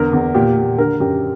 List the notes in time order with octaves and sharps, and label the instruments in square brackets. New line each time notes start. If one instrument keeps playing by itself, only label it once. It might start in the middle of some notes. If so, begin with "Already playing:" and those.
Already playing: [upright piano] E2 D3 A#4
E2
A#2 G4
A#2
D3 A#4
F#2 G4